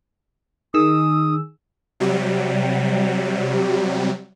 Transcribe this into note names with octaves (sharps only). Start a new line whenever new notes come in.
D#3 D#4 G#4 D#6 E6
C3 F#3 G3